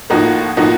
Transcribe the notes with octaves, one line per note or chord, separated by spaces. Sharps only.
A2 F3 A#3 D#4 F#4
A2 F3 A#3 D#4 F#4